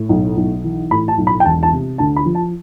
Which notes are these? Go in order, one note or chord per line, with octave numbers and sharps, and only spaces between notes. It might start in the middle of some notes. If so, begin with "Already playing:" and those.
Already playing: A2
B1
B1
E3
A2 B5
A5
B1
B5
G5
E1 A5
A5
C3
D2 A5
B5
F3
A5